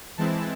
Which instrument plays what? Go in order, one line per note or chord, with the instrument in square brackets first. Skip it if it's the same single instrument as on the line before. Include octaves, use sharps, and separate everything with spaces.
[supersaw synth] E3 G#3 C4 E4 A5